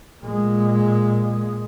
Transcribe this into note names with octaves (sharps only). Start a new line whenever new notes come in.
A#2 G#3